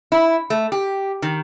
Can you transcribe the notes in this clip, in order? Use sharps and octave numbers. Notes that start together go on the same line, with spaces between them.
E4
A3
G4
D#3